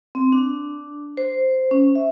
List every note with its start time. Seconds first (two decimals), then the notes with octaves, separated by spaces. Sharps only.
0.15 C4
0.32 D4
1.17 C5
1.71 C#4
1.95 E5